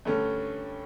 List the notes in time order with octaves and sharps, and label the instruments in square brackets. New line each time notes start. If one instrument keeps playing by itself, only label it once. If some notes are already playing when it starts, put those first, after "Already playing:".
[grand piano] G2 D3 A3 C#4